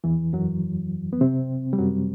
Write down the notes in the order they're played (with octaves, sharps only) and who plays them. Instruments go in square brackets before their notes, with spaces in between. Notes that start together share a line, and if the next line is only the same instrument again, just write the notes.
[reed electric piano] E2 E3
F#2 F#3
B3
C3 C4
G3
F#2 F#3